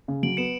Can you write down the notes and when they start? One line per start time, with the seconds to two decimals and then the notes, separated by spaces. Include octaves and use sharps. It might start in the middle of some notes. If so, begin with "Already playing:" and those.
0.08 C#3
0.23 F#3 D7 F#7
0.37 B3 C#7 E7